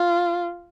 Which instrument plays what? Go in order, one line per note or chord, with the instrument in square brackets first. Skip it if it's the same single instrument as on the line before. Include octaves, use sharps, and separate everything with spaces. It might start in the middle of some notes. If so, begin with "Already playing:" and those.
Already playing: [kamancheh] F4